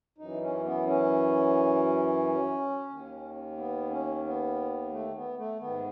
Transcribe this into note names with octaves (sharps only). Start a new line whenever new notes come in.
F#2 E3 D#4
C#4
B3
C#4
D#2 D#3
B3
C#4
B3
A3
B3
A3
G#2 D#3 B3